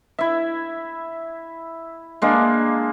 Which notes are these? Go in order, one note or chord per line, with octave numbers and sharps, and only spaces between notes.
E4 E5
G#3 A#3 D4